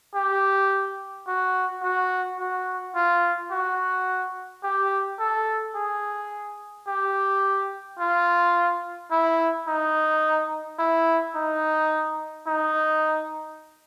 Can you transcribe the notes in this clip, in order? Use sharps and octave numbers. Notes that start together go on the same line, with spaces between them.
G4
F#4
F#4
F#4
F4
F#4
G4
A4
G#4
G4
F4
E4
D#4
E4
D#4
D#4